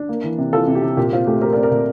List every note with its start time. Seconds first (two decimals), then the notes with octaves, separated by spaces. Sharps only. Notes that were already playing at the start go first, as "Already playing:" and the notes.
Already playing: D4
0.09 A#3
0.24 E3
0.38 C3
0.53 E3 F4 A4
0.67 C3
0.75 G4
0.82 C3
0.97 A#2 G4
1.13 C4 F4
1.27 A3 G4
1.41 C4 G4 A#4
1.53 A#4 D5
1.57 C4
1.63 A#4 D5
1.71 A#2